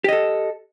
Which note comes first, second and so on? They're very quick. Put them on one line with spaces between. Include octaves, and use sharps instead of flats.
G4 D#5 A4